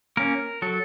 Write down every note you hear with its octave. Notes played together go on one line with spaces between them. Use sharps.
A#3 C#4 A#4
F#3 A4